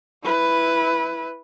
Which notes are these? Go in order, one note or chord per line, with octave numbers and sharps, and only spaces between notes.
E4 B4